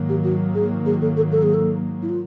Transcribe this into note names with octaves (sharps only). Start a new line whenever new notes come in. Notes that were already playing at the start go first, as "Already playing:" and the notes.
Already playing: G#2 D#3 F#3 A#3
G4
F#4
G#4
G#4
A4
A4
A4
G#4
A4
E4
F4